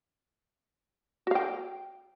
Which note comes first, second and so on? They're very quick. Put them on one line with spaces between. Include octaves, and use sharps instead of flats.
F#4 F5 G5